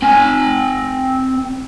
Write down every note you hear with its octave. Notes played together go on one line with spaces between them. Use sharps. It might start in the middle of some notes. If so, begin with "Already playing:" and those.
C4 G#5